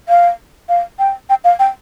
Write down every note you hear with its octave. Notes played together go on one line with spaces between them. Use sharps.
F5
F5
G5
G5
F5
G5